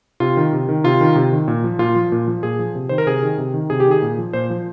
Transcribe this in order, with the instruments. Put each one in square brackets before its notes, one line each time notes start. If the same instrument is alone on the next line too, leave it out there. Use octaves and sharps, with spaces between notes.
[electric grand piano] C3 F4
D#3
C3
D#3
C3 F4
D#3
C3
D#3
A#2
F3
A#2 F4
F3
A#2
F3
A#2 G#4
F3
C3
D#3 C5
A#4
C3 G#4
D#3
C3
D#3
C3 G#4
G4
D#3 G#4
A#2
F3
A#2 C5
F3